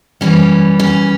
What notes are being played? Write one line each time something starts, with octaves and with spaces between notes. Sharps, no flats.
F#2 E3 G3 C#4
C#4